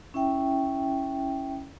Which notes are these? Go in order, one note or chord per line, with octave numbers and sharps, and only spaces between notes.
C#4 E4 E5 G5